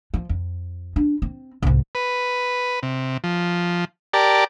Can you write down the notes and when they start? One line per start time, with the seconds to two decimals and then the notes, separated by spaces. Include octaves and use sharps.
0.14 F3
0.29 F2
0.96 D4
1.22 C4
1.62 C2 G#2
1.95 B4
2.83 C3
3.24 F3
4.14 G4 A#4 D5 A5